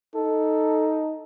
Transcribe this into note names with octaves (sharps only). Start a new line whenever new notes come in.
D#4 A4